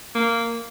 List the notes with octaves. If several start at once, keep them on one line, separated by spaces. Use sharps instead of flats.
A#3